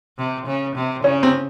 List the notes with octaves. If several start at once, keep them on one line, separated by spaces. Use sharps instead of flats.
C3
C#3
C3
C#3 C#4
C4